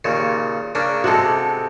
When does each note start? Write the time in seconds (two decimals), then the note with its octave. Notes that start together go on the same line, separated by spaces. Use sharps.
0.05 D#2 A#2 C#3
0.75 C#3 A#3 D4
1.04 C3 G#3 F#4 A4